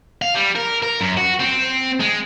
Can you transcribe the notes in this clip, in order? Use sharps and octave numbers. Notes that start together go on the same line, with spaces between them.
F5
G3
A#4
A#4
F#2
F#4
C4
G#3